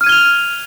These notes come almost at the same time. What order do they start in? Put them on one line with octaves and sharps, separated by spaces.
F6 D#7 G#6 G7 F7